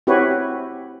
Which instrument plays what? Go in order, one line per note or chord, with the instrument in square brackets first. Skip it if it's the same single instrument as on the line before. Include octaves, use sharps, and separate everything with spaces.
[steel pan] C4 E4 F#4 G4 B4 C#5